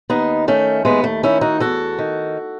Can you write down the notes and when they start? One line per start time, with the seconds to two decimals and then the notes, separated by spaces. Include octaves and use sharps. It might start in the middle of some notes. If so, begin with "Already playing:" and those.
0.10 D#2 B3 D#4
0.48 D#3 A3 C#4
0.85 D#2 G#3 B3
1.04 A3
1.23 D#3 C#4 E4
1.41 D#4 F#4
1.60 E2 F#4 A4
1.99 D#3